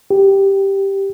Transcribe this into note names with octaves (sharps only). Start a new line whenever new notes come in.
G4